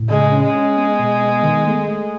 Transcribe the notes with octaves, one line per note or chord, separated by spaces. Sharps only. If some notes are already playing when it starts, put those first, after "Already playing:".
Already playing: A2
C#3 G#3
C#4
G#3
C#4
B3
B2
B3
D#3
A3
A3